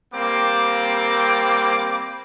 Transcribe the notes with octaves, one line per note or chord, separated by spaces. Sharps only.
G3 A#3 C4 D6